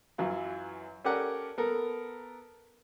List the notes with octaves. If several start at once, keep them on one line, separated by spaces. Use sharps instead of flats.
F#2 E3 F#3 F4
C#4 G4 A4 A#4 D5 F#5
B3 A4 A#4